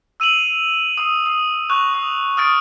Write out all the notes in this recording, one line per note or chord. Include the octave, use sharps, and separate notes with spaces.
E6 D#7 F7 F#7
D#6
D#6
C#6 F#6 F7
D#6
D#6 F6 A6 D7